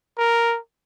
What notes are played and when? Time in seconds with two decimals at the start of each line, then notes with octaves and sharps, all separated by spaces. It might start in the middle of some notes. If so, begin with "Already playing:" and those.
0.18 A#4